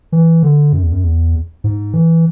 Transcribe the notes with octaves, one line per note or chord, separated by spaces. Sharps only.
E3
D3
F#2
E2
F#2
E2
G#2
E3